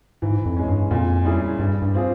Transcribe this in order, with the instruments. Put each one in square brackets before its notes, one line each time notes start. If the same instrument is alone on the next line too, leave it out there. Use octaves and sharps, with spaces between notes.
[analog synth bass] G#2 [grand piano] E3
[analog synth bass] F2
[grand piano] G#3 C#4
[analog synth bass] G2
[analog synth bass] F2 [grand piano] A#2
[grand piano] G3 C#4 E4 G#4
[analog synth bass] G2 [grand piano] G3
[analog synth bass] G2
[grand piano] C4 F4 G#4